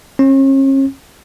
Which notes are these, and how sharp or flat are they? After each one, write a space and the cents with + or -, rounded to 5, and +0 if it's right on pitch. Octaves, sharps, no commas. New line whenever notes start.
C#4 -40